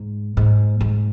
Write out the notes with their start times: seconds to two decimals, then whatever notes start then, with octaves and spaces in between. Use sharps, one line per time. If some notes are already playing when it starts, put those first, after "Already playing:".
Already playing: G#2
0.37 G#2
0.81 G#2